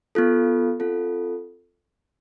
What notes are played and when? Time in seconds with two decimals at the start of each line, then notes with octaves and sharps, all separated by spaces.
0.15 B3 F4 A4
0.80 C4 F4 A4